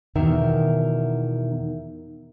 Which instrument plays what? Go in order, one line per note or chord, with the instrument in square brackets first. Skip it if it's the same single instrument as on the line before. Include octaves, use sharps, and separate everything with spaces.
[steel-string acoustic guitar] E2 B2 D#3 A#4 E5